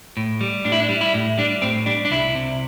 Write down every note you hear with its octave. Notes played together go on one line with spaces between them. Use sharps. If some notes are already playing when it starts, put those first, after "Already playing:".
A2
G3
A2 D4
E4
D4
G3
E4
A2
G3 D4
A2 C4
G3 D4
D4
C2 E4
C3